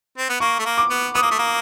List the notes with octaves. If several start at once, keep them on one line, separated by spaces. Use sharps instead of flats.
C4
B3
A#3 C#6
A3
A#3
D6
B3
B3 D#6
A#3
A3
A#3